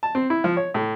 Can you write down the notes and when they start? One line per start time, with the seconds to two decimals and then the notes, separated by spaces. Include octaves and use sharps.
0.03 A5
0.15 C4
0.30 E4
0.44 F3
0.57 C#5
0.74 A2